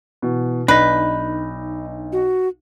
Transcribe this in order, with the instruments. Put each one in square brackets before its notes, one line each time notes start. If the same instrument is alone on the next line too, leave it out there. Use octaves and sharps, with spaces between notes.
[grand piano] B2 E3 F#4
[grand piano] B1 [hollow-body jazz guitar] D4 D#4 [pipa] B4
[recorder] F#4